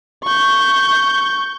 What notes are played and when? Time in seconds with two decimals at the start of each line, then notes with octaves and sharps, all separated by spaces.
0.24 C#6 G6